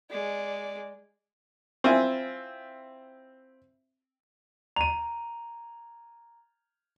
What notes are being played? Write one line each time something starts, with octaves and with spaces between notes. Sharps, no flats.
G#3 D5
C4 E4 F4 E5 G#5
A#5 D#7 F7